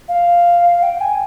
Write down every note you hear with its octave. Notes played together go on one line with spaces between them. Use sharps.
F5
G5
G#5